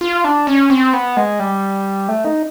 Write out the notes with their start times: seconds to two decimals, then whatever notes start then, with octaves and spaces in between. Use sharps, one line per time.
0.01 F4
0.24 D4
0.47 C#4
0.70 C4
0.93 B3
1.17 G#3
1.40 G3
2.08 A3
2.25 D#4